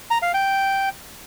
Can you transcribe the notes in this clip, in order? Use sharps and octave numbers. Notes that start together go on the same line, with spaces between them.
A#5
F5
G5